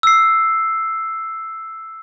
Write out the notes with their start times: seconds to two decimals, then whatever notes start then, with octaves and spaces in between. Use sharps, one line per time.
0.03 E6 C7